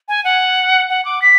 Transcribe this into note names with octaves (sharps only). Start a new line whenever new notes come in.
G#5
F#5
F#5
D6
B6